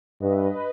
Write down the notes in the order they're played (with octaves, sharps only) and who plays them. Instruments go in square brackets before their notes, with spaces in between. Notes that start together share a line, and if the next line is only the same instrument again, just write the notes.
[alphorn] G2 [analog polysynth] B4 D#5
[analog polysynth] E5
B4 D#5